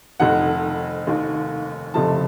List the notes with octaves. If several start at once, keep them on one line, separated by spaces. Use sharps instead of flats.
F1 F2 D#3 F#5
F1 D#2 D#3
F#1 F2 C3 F3 A3 A5